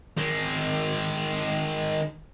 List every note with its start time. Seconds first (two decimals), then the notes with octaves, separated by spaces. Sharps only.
0.17 D#3 G#3